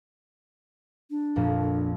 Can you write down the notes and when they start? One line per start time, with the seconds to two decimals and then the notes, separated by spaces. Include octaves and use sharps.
1.10 D4
1.36 A#1 F2 A#2